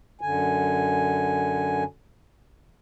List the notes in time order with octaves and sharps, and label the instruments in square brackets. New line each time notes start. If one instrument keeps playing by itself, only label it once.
[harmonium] F#2 D3 G#5